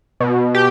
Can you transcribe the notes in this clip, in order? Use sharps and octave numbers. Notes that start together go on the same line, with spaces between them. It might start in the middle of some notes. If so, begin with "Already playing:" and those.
B2
G4